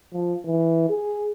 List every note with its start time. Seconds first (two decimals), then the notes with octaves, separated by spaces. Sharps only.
0.13 F3
0.45 E3
0.89 G#4